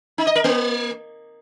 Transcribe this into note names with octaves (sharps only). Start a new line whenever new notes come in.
D#4
D#5
A#4
A#3